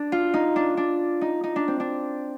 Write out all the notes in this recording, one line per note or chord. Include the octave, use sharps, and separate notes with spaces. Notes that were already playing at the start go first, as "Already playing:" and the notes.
Already playing: D4
F4
D#4
D4
D4
D#4
D#4
D4
C4
D4